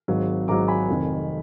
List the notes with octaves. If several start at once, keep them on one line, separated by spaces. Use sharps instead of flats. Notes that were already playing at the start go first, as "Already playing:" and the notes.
G#1 G#2 F#3
G#1 G#2 F#3 A#5 D6
G#5 B5
F1 F2 D#3